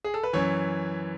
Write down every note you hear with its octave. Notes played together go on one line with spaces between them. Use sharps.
G#4
A4
B4
F#2 E3 C#5